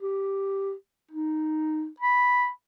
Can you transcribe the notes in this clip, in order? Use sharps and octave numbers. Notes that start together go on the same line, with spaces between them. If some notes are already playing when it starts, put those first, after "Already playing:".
G4
D#4
B5